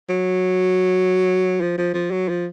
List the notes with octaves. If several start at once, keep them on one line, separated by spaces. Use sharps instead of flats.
F#3
F3
F3
F3
F#3
F3